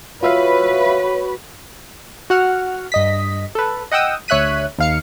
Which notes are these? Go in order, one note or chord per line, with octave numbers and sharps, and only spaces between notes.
F4 F#4 B4 C#5 E5 F5
F#4 F#5 F6
G2 D#5 B6
A4 B4
D#5 F#5 G5 D#6 E6
D2 C#5 E5 F#6 B6 D#7
D#2 F5 C#7